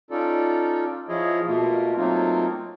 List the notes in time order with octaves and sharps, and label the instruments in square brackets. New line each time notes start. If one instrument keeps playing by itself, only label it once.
[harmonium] C#4 D#4 F4 A4 D5
F3 E4 F4 G#4 C#5 D#5
B2 A3 A#3 F4
F#3 A3 A#3 C4 D#4 F4